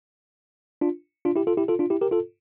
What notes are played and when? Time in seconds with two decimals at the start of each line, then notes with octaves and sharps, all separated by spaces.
0.81 D4 F4
1.25 D4 F4
1.36 E4 G4
1.47 F4 A4
1.57 E4 G4
1.68 F4 A4
1.79 D4 F4
1.90 E4 G4
2.01 G4 A#4
2.12 F4 A4